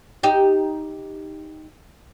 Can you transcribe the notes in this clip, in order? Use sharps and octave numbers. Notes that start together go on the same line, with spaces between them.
D#4 G4